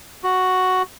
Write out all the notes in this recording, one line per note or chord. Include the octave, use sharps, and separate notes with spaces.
F#4